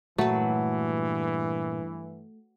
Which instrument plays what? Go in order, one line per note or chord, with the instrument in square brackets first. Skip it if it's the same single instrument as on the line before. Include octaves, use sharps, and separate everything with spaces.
[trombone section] G2 E3 [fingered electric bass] A#2 [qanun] F#3 B4 [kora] A3